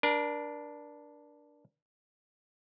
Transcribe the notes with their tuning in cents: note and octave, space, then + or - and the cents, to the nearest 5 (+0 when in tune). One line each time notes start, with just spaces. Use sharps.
D4 +0 A#4 +35